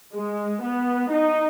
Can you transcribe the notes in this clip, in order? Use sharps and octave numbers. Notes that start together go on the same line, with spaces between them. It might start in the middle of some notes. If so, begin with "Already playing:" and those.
G#3
B3
D#4